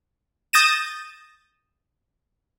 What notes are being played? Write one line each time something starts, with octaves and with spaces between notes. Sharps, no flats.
D#6 G6 A6 A#6 D#7 E7